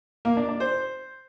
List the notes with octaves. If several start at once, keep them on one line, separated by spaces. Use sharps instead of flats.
A#3
D4
D4
C5